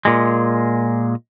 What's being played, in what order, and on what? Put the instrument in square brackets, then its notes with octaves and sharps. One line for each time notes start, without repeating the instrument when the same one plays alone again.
[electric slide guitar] A#2 G#3